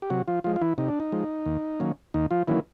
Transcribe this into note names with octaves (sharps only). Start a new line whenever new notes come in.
G4
C3 F#3 F#4
F3 F4
F3 G#3 F4
F4
E3 E4
C3 D#4
D4
D#4
F3 G#3
D#2
D#3 F#3 A#3 C#4
D#2 D#4
F3 F4
D#3 E3 F#3 A#3 C#4 E4